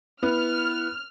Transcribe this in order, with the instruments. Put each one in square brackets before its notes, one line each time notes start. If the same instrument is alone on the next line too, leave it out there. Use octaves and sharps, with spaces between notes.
[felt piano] B3 [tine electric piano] E4 [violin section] F6